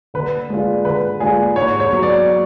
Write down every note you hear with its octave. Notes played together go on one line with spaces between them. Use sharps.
D3 B4
G#3 D4 F4
D3 B4
G#3 D4 F4 G#4
G#2 C#5
C#5
F#3 B3
D5